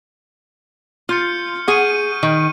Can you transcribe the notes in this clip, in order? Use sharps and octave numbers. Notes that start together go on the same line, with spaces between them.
F4 F6 G6 C#7
G#4 F#5 C#6 D#7
D#3